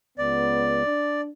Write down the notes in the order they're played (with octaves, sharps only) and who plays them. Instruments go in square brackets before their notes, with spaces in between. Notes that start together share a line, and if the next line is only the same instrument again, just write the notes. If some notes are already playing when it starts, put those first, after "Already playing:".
[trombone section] C#2 B3 [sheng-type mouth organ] D5
[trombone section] D4